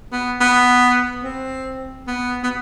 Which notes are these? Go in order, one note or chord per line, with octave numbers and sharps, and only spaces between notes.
B3
B3
C4
B3
B3